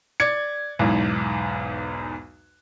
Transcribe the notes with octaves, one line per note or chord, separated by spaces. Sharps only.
D5 G#6 C#7
B1 E2 G#2